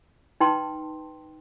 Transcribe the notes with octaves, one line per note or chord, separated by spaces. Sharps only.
D#4 B4 G5 A5 C6